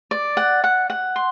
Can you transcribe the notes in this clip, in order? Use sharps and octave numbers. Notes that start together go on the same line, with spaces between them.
D5
F#5
F#5
F#5
C6